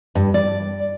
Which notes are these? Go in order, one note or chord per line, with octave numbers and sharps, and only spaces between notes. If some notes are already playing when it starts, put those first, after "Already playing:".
G2
D5